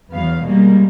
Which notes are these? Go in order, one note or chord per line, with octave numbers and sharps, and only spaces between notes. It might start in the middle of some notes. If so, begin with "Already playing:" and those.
E2 F#3 B3 F5
B2 G3 G#3 A#3